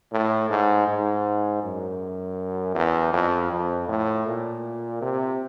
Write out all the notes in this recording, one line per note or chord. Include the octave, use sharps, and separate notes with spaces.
A2
G#2
G#2
F#2
E2
F2
F2
A2
A#2
C3